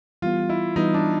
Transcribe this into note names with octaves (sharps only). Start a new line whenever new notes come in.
E3 G3 B3 F4
E4
E3 G3 B3 D#4
D4